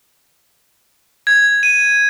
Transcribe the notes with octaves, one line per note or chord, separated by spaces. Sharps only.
G#6
D#7